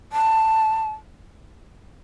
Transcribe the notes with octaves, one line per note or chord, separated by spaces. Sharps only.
A5